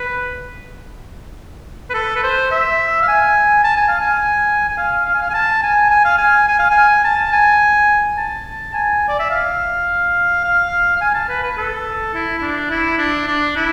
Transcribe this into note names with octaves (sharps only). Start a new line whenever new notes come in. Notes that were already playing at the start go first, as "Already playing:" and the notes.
Already playing: B4
B4
A4
B4
C5
E5
F5
G#5
A5
G#5
F5
G#5
G#5
F5
F5
G#5
F5
G#5
A5
G#5
G#5
F5
G#5
G#5
F5
G#5
A5
G#5
A5
G#5
D5
E5
F5
F5
F5
G#5
A5
B4
B4
A4
E4
E4
D4
E4
D4
D4
E4